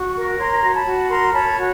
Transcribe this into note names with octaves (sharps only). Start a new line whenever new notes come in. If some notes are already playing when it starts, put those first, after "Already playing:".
Already playing: F#4 C#6
A#4
C#5 A#5 C6
F#4
A5 B5
F#4
A#4 A#5 C6
C#5 A5 B5
F#4